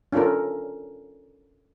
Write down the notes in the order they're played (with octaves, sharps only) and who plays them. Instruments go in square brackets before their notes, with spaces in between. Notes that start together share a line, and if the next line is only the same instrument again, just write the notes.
[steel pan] C#4 D4 F4 A4 A#4